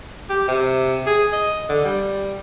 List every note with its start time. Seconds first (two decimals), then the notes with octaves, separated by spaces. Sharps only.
0.29 G4
0.48 C3
1.07 G#4
1.32 D#5
1.69 D3
1.85 G3